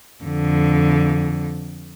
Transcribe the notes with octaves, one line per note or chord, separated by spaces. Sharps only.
F2 D3